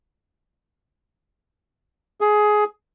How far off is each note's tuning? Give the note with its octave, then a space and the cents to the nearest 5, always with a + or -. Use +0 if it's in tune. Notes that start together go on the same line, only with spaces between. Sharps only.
G#4 +15